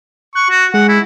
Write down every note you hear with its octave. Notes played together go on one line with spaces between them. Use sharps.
C#6 F#6
F#4
G#3 F#5
E4